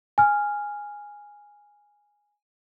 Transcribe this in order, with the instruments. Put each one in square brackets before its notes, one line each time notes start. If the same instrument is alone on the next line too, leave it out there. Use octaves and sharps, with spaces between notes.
[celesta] G#5 F6